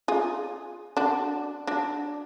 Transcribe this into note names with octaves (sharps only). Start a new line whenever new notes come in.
F4 G#4
D4 F#4
D4 F#4